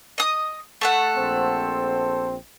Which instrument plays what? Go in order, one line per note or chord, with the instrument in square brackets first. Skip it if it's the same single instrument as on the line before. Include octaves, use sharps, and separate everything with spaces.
[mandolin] D#5 D#6
A3 A4 F#5
[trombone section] A#1 C4 C5